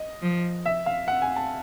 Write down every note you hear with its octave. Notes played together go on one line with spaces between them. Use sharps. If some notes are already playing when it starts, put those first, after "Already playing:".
Already playing: D#5
F3
E5
F5
F#5
G#5
A5